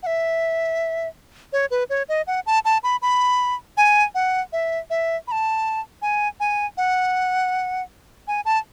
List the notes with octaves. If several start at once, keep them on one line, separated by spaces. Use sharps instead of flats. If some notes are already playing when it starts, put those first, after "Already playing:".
F#5
E5
C#5
B4
C#5
D#5
F#5
A5
A5
B5
B5
G#5
F#5
E5
E5
B5
A5
G#5
G#5
F#5
G#5
A5